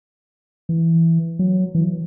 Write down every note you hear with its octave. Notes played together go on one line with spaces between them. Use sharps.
E3
F#3
E3